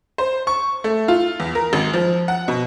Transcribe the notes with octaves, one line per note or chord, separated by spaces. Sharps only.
C5
C#6
A3
F4
E2
A#4
G#1
F3
F#5
B2